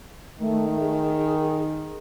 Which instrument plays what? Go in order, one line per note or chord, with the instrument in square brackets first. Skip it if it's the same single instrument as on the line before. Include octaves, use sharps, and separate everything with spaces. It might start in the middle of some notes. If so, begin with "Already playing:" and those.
[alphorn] D#3 [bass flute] A3
[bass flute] G#4